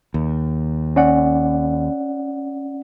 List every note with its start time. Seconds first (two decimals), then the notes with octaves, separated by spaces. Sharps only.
0.14 D#2
0.96 C#4 D5 F#5